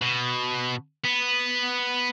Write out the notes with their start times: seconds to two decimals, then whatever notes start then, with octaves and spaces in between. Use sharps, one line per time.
0.02 B2
1.04 B3